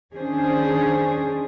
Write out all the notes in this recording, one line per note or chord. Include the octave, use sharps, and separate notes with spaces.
D#3 C#4 D4 G#4 C5